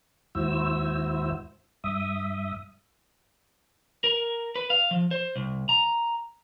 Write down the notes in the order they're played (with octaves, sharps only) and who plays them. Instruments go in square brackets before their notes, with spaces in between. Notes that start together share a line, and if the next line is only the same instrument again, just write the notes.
[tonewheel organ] D#2 G#2 E4 F#4 C5 E6
G2 E5 D#6
[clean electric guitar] A#4
B4
F5
F3
C5
C2
A#5